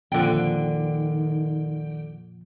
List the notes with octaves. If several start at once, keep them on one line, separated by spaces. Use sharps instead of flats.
F2 A#2 D3 D#3 F3 G5